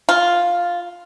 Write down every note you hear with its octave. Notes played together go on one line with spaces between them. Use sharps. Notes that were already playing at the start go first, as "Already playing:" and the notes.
F4